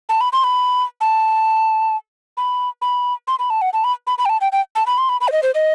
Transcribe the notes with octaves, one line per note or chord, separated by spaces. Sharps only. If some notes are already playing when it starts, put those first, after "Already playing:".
A5
B5
C6
B5
A5
B5
B5
C6
B5
A5
F#5
A5
B5
B5
B5
G5
A5
G5
G5
A5
B5
C6
B5
B5
C5
D#5
C5
D#5